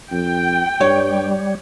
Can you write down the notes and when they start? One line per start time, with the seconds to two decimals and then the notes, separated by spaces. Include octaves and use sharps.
0.12 F2 G5
0.81 G2 G3 C#5